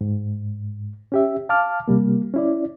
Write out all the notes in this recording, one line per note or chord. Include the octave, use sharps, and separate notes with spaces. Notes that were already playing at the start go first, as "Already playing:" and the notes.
G#2
C#4 G4 E5
F5 A5 D6 F6
C3 G3 A#3
C#4 E4 D5